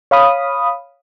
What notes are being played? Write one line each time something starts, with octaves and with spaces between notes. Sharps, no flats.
C#5 F5 B5 D#6